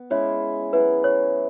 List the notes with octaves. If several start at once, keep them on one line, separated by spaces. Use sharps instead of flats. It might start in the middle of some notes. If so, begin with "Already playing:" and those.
Already playing: B3
G#3 C#4 E4 G#4 C#5
F#3 E4 G#4 B4
C#5